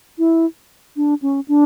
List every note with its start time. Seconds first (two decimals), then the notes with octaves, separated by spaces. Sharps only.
0.19 E4
0.96 D4
1.22 C#4
1.48 D4